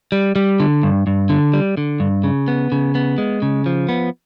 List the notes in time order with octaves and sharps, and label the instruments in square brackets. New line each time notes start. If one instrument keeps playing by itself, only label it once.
[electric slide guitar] G3
G3
D3
G2
G2
D3
G3
D3
G2
C#3
B3
C#3
B3
G#3
C#3
F3
B3